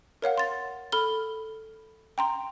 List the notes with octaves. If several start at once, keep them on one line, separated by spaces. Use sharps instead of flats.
A#4 C#5 F5 F#5
C6 A6
A4 B5 F6 G7
G5 A#5 C6